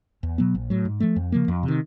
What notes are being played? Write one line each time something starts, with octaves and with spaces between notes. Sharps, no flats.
E2
B2 F#3 B3
A#1
A2 F#3
G#2
F3 A3
F2
C#3 F3 A#3
F2
C3
D#3